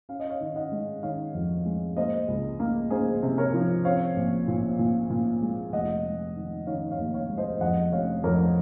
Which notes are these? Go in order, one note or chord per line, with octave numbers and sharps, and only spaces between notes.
C#4 F5
D#5
C#5 F5
D#3
D#5 F#5
G#3
D#3 C#5 F5
F2
G#3
A#3 C5 D#5
C#2
A#3
A#3 G#4 C5
C3
A#4 C#5
F3
C4 C#5 F5
A#1
A#2
A#2
A#2
G#3
F1 D#5 F#5
G#3
D#3
D#3 C#5 F5
C#5 F5
D#2
C#5 F5
G#3
C5 D#5
F2 D#5 F#5
F1 C#5 F5
F2 A#4 C#5